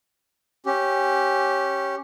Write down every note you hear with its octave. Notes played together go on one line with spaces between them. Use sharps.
C#4 G4